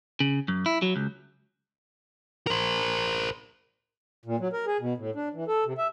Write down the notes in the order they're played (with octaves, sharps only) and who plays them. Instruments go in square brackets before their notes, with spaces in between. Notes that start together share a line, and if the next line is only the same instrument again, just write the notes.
[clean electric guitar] C#3
F#2
E4
F#3
C#2
[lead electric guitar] A#4 C5
[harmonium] A#2
F#3
A#4
G#4
B2
A2
D4
E3
A4
C3
E5